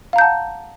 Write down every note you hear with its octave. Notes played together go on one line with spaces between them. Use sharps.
F5 F#5 A5 A#5 G6